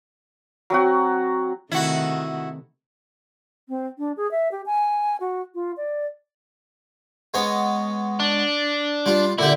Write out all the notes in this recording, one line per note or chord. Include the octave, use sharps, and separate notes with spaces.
F#3 C4 F#4
C3 D#3 A3 E4 F#4
C4
D4
G#4
E5
G4
G#5
F#4
F4
D5
G#3 B3 C#5
D4
G3 F4
A#2 D3 E4 G4